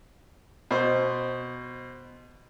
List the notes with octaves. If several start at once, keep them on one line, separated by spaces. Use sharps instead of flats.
B2 C5